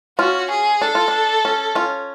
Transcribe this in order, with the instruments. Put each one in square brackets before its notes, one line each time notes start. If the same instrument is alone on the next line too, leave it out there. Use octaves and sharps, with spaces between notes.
[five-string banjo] C#4 F4 [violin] F#4
[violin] G#4
[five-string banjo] D4 [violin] A4
[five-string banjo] F4
D4
C#4
C#4 F4